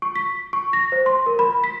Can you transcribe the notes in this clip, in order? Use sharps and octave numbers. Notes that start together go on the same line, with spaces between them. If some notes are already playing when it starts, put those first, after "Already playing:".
C#6
B6
C#6
A#6
C5
C6
A#4
B5
B6